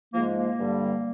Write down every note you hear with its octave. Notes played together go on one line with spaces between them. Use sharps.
G#2 F3 G#3 A#3
A#3
G2 D3 G3